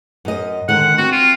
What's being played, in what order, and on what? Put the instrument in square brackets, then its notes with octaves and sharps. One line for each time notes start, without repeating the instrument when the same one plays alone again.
[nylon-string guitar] F#2 D#5
[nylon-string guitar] D3 D#3 G#3 [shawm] F#5
[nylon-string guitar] C4 [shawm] F#4
[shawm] F4